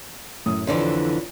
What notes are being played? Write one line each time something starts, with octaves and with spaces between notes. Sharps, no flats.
F#2 A2 D#6
F2 D3 E3 C#5 D5